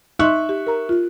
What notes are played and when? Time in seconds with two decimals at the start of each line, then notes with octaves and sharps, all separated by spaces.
0.19 D#4 D#5 E5 C6 C#6 F#6
0.49 G4
0.67 A#4 A#5
0.89 F4